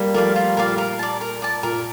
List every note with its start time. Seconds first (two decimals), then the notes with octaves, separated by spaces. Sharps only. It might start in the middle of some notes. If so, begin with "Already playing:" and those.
Already playing: G3 A#3
0.14 F3 A3 A#4 D5 F5
0.36 F4
0.57 A#2 A#4 D5 F5
0.78 A#4
0.99 D5 A5
1.21 A#4
1.42 D5 A5
1.63 A#2 A#4